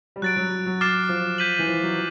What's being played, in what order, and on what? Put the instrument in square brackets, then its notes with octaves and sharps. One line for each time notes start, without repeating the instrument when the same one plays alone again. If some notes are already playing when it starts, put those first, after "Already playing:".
[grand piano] G3
[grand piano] F#3 [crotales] F#6 A6 D7
[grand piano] F#3
F#3
[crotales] D6 F6 A6 C7 E7
[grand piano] F3
[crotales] G6 B6 D#7 F#7
[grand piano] E3
F3
F#3